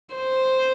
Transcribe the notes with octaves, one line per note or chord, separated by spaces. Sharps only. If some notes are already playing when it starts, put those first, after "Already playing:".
C5